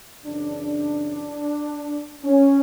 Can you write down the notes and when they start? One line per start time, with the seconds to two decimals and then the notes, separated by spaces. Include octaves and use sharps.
0.25 F#2 C#3 E3 D4
2.23 C#4